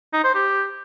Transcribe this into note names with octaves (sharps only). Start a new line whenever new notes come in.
D#4
C5
G4